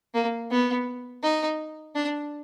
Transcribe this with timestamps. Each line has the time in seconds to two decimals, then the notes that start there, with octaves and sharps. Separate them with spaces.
0.14 A#3
0.51 B3
1.23 D#4
1.95 D4